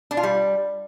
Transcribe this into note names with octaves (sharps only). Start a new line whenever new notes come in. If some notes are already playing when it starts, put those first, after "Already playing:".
D4
F4
G3